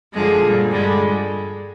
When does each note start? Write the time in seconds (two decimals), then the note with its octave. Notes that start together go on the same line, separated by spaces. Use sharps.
0.14 F#2 D3 F3 G#3 G#4
0.43 A#2 G3
0.71 G2 D3 G3 G#3 G#4